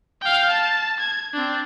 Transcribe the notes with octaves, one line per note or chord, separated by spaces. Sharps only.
F5 G5
A5
G#6
C4 D4